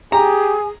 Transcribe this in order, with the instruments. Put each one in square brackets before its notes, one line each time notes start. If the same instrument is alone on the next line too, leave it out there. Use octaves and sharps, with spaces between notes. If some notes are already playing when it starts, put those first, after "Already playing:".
[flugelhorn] G4 [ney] G#4 [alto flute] G#5 [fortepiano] A#5